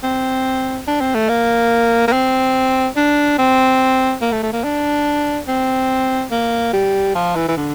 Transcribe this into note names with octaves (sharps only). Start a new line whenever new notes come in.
C4
D4
C4
A3
A#3
A#3
C4
D4
C4
A#3
A3
A3
A#3
D4
C4
A#3
G3
F3
E3
E3
D3